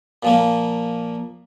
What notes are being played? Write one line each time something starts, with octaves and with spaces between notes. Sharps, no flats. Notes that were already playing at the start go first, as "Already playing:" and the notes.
A#2 F3 A#3